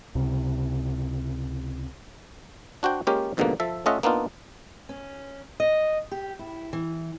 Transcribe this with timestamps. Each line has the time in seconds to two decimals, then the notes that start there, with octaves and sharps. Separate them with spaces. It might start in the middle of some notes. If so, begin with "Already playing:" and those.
0.15 C#2 C3
2.83 D4 F#4 C5 G5
3.07 G#3 A#3 C#4 F4 G4 A#4
3.37 F2 G#2 B2 D3 D#3 A#3
3.60 F3 A4 E5
3.86 A3 C#4 F4 D#5 E5 F#5
4.03 A#3 B3 D4 D#4 F4
4.89 C#4
5.60 D#5
6.12 G4
6.39 E4
6.73 E3